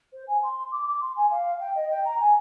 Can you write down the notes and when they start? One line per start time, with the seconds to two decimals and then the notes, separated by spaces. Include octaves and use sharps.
0.13 C5
0.27 G#5
0.42 C6
0.71 D6
0.86 D6
1.01 C6
1.16 G#5
1.30 F5
1.59 G5
1.75 D#5
1.90 G5
2.05 A#5
2.20 G#5